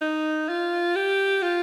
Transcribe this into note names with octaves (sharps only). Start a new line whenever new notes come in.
D#4
F4
G4
F4